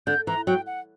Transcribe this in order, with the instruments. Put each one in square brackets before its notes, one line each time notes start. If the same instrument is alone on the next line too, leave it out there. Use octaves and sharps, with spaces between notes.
[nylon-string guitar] D3 [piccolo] G6
[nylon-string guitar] E3 [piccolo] A#5
[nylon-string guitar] F#3 [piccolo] G5
[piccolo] F#5